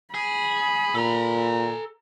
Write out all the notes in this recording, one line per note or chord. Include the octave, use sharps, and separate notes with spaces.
G#4 B5
A#2 A4 A#5